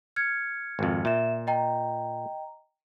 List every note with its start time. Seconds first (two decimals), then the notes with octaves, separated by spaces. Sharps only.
0.16 F6 G#6 C#7
0.79 G#1 F2
1.05 A#2 E5 E7
1.47 D#5 G5 A#5